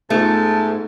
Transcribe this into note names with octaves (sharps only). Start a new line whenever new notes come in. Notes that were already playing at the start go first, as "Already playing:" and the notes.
G#2 A3 B3 D#4 F4 A5